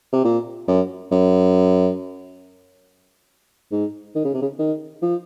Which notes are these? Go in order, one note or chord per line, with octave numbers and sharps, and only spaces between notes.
C3
A#2
F#2
F#2
G#2
D#3
C#3
C3
C#3
D#3
F3